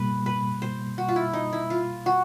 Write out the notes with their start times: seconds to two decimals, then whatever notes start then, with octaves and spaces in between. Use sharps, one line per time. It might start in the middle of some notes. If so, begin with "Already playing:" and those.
Already playing: B2 G3 A#3 B4
0.26 B4
0.62 C5
0.98 F#4
1.08 F4
1.16 E4
1.33 D#4
1.53 E4
1.70 F4
2.06 F#4